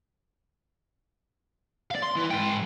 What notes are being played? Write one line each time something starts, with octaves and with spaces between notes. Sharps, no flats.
D5 F5
C6
E3
G#2 G5